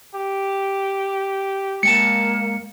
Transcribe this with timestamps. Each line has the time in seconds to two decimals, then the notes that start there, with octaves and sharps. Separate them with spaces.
0.15 G4
1.83 G#3 A#3 G5 A5 C#7